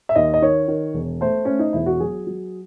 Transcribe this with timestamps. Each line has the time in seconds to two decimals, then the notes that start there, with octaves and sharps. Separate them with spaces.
0.09 E5
0.15 D#2 D#5
0.34 D#5
0.42 D#3 C#5
0.68 D#3
0.94 E1
1.21 A3 C5
1.45 A3 C#4
1.59 D#4
1.73 E1 E4
1.86 F#4
2.00 F#3 G#4
2.27 F#3